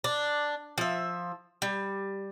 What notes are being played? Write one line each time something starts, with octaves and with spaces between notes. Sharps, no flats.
D4
F3 E5
G3